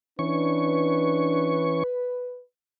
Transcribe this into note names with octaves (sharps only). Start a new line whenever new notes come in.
E3 C#4 D4 B4 C#6